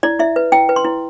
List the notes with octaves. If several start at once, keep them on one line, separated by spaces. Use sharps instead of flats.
E4 D5
E4 E5
B4
E4 G5
B4
C6
E4